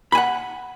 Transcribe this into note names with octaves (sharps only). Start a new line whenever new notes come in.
F#5 G#5 B5